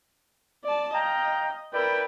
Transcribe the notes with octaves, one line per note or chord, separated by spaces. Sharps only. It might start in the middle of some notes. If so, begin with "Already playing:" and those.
D5 A5
D#5 F5 G5 A#5
E4 A#4 B4 D5 G5